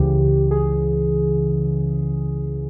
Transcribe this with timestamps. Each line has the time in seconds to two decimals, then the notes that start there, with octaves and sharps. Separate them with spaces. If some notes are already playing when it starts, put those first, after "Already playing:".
Already playing: C#2 C#3 E3 G4
0.51 G#4